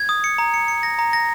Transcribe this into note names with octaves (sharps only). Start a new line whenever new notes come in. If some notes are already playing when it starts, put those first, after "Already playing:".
Already playing: G#6
D#6
C#7
A#5
C#7
C#7
A#6
A#5
A#6